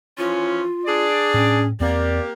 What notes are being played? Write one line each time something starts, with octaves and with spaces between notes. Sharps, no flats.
E3 F3 C#4 F4
D4 G#4 D5
A2 C#4
E2 A#3 C4 G4 D5